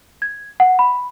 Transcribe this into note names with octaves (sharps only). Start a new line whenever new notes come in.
G#6
F#5
B5